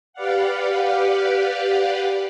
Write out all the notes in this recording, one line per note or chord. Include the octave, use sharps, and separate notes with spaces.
G4 B4 D5 F5 F#5